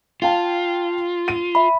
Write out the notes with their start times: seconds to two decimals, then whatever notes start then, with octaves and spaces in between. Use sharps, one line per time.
0.22 F4 F5 G5 A5
1.28 D#7
1.55 E5 B5